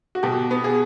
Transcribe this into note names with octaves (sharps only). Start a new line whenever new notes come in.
F#4
B2 G4
B3
G#4